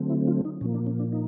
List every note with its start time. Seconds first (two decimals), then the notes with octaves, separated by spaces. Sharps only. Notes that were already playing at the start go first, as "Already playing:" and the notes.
Already playing: D3 F#3 A3 C4
0.10 E4
0.27 F4
0.45 D#4
0.61 A#2 F3 A#3 C#4
0.74 D4
0.86 C#4
0.99 D4
1.12 D#4